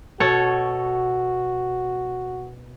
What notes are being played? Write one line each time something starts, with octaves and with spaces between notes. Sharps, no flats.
B2 F#4 A4 C#5